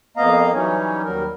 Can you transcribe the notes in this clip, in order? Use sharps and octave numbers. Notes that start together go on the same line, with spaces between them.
F2 A#3 B3 D#5 F5 A#5
E3 F#3 G3 C#4 D#4 C#5
D#2 F#3 G3 A#4